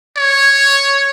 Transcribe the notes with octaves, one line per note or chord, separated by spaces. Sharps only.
C#5